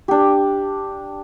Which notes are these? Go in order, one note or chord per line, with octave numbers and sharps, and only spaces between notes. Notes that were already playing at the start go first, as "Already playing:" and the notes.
D4 G4